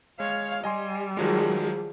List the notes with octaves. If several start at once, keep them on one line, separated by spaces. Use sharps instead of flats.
G#3 C#5 F5
G3 D#5 G#5 C6
D#3 F3 F#3 G#3 G#4